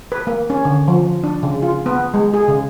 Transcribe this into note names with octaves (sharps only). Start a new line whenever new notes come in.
B4
A#3
C#4
D3
F3
D4
C#3
F4
B3
G#3
G#4
C#3